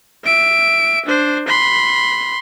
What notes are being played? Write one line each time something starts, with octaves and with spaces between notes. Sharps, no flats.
E5 D7
D4 C5
B5 C6